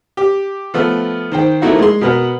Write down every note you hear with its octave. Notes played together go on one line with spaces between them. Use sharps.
G4
F3 A3 B3
D#3 C5 G5
F3 A3 A#3 D#4 E4 F#4
G#3 C6
B2 A#4 B4 F#5